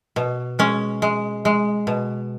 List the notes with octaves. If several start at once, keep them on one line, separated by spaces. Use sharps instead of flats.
B2
G#3 C#4
G#3
G#3
B2